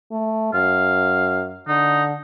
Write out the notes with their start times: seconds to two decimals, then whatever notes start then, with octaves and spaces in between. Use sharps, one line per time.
0.11 A3
0.54 F#2 F5
1.67 D3 D#4